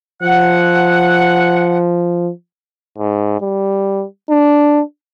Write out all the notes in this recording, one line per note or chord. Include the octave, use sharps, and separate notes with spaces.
F3 F#5
G#2
G3
D4